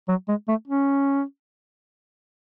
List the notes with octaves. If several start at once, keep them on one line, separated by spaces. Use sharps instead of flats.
F#3
G#3
A3
C#4